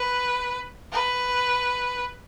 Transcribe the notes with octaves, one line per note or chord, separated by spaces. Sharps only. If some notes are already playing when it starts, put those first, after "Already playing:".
Already playing: B4
B4